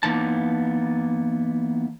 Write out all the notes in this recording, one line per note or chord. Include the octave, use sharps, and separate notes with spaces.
E3 A#3 B3 D#4 A5